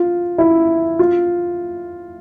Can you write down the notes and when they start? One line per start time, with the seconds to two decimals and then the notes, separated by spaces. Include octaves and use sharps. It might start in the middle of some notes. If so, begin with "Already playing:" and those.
Already playing: F4
0.38 E4
0.99 F4